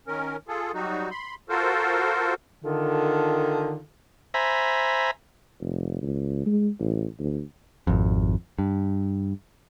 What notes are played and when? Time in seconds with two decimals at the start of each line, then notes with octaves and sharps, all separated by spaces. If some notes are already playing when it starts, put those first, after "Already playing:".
0.07 D#3 C#4 A#4
0.48 F4 G#4 A4
0.74 F#3 G3 D#4 F#4
1.11 B5 C6
1.49 F4 F#4 A4 A#4 C5
2.64 D3 D#3 F4 A4
4.34 C5 E5 G#5 A#5 B5
5.60 F1
6.02 C#2
6.46 G#3
6.80 A1
7.19 D2
7.87 G#1 F2
8.59 G2